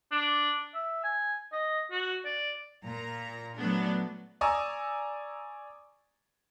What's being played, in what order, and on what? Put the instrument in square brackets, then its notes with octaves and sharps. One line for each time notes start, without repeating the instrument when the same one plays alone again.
[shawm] D4
E5
G#5
D#5
F#4
D5
[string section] A#2 A#5
F#3 A3 B3 D4
[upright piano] D5 G#5 A#5 C#6 D#6 E6